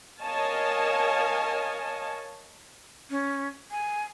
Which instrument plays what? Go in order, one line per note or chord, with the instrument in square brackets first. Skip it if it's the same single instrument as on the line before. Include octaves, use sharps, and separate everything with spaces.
[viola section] A#4 C#5 D#5 F5 G#5 A5
[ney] C#4
G#5